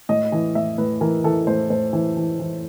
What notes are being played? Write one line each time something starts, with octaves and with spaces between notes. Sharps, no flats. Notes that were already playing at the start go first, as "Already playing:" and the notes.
A2 D#5
E3
A2 E5
A2 B4
E3 A#4
E3 A4
A2 C5
A2 C5
E3
E3
E3